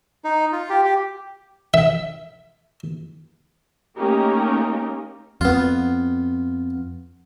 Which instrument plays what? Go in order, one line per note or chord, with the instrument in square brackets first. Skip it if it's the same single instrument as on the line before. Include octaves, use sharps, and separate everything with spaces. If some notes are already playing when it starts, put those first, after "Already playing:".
[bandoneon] D#4
F4
G4
G4
[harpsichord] E5
[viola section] A3 A#3 C#4 D#4 G4 A#4
[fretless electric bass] F2 [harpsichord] B3 F4